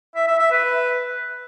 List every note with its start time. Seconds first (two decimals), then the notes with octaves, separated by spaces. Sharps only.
0.15 E5
0.27 E5
0.39 E5
0.51 B4